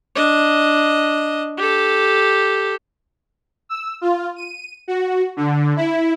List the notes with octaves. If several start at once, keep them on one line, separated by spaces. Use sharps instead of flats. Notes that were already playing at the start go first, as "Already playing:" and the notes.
D4 D#5
G4 A4
E6
F4
D#7
F#4
D3
E4